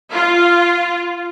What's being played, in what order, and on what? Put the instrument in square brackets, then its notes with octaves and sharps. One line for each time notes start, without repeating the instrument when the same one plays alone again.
[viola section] F4